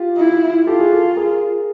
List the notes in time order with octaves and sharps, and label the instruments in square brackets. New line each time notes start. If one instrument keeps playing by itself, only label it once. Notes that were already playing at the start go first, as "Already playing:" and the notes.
Already playing: [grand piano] F4 G4
[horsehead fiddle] E4
[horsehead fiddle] F4 [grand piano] G4 A4
[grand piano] F#4 G#4
G4 A4
G#4 A#4